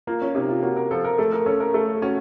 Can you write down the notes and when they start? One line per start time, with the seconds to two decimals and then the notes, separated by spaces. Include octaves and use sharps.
0.07 A#3 F4
0.22 C#4
0.35 C3 D#4
0.49 F4
0.62 A#3 F#4
0.76 A#4
0.91 F3 A4
1.04 A#4
1.18 A3 A4
1.32 A#4
1.46 C#4 A4
1.60 A#4
1.74 A3 A4
2.02 C#4 F#4